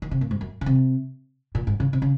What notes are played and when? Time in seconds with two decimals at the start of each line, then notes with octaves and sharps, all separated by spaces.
0.02 D#3
0.11 C3
0.21 A#2
0.31 G#2
0.41 F#2
0.61 C#3
0.66 C3
1.55 A#2
1.67 G#2
1.80 C#3
1.93 C3
2.02 C#3